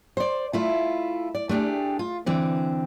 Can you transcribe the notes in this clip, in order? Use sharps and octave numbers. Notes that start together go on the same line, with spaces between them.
C5 D5
A3 E4 F4
D5
A3 D4 G4 G#4
F4
D3 E3 C4